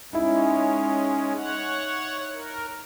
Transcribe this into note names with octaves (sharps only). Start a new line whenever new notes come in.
G#3 C#4 D#4 E4
C#5 F#5
A#4